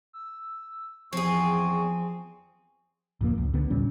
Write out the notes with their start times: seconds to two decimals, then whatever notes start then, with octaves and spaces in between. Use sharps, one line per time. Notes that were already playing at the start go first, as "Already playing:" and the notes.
0.13 E6
1.13 E2 F3 C4 G#4 C#6
3.21 D1 F2 A#3
3.38 C#2
3.54 C#2 D3 B3
3.70 D#2 A#2 G3 C#4